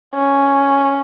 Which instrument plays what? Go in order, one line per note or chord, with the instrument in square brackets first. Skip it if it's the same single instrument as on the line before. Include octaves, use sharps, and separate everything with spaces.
[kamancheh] C#4